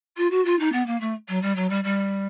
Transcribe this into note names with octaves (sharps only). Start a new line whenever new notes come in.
F4
F#4
F4
D#4
B3
A#3
A3
F#3
G3
F#3
G3
G3